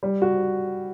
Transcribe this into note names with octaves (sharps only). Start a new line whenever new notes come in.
G3
F#4